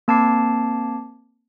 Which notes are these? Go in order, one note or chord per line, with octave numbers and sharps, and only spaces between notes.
A#3 C4 A5 D6 G#6 C7